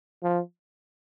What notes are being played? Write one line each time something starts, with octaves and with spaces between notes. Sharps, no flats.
F3